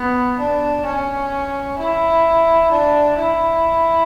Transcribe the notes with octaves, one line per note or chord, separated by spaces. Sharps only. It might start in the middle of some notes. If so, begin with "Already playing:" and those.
Already playing: B3
D4
C#4
E4
D4
E4